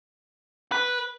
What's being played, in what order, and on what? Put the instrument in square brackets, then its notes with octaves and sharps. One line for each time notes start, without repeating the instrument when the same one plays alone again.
[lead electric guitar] B4